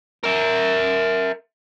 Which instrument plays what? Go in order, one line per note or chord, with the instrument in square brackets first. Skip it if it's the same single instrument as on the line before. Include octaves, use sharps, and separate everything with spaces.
[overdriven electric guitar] A#4 E5